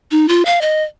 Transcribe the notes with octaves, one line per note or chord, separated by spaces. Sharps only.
D#4
F4
F5
D#5